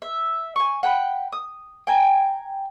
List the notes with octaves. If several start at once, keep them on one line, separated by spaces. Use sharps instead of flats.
E5
G#5 C#6
F#5 G5 B5
D#6
G5 G#5 A#5